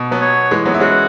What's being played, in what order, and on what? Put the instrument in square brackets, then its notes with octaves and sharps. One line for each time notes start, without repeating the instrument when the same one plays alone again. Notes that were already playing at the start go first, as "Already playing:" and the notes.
Already playing: [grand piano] B2
F#3 B3
[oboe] C#5
[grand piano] E3 G#3
F#3 B3
E4
[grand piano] G#3 C#4 [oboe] F#4